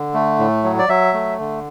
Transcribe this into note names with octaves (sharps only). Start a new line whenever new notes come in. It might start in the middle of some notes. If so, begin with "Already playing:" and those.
Already playing: D3
A3
A2
F#3
D5
F#3 E5
A3
D3